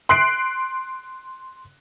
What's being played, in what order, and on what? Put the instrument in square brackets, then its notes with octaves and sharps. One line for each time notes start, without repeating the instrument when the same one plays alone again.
[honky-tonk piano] C6 F#6 C7 D7